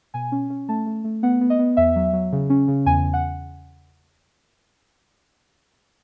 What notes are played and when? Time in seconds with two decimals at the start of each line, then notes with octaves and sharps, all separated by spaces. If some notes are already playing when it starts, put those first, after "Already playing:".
0.14 B2 G#5
0.32 C#4
0.50 C#4
0.69 A3 A5
0.86 A3
1.04 A3
1.23 B3 F#5
1.41 B3
1.50 D#5
1.59 B3
1.77 E2 E5
1.96 F#3
2.13 F#3
2.32 C#3
2.50 C#4
2.68 C#3
2.86 E2 G#5
3.04 E2
3.13 F#5